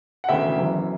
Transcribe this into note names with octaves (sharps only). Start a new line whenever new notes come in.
F#5
E1 D2 C#3 E3 E5 G5
F#1 F#2 C#3 E3